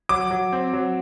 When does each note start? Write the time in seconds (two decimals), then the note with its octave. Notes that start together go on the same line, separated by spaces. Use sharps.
0.09 F#3 D6
0.31 F#3
0.52 C4
0.73 F#3